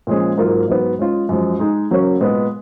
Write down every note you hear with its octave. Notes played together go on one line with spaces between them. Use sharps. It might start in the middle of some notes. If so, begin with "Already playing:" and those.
A#2 F3 G#3 C#4 G#4
G#2 F#3 A#3 F4
G#2 F#3 B3
G#3 C#4 F4
F#2 F3 G#3
G#3 D#4 G#4
C#3 F#3 A#3 C#4
A#2 G#3 B3